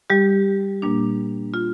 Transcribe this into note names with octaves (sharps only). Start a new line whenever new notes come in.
G3 G4
A#2 G3 A#3 D4
F4